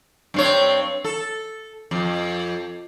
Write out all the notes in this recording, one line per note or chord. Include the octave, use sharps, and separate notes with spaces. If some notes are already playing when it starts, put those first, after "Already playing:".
G2 C4 C#5
A4
F2